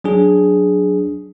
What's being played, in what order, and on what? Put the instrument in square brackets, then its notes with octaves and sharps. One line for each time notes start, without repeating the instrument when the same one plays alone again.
[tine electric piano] F#3 D4 G#4